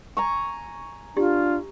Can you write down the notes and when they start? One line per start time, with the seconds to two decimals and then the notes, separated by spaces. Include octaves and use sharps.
0.17 G#5 A#5 C#6
1.17 D4 F4 G4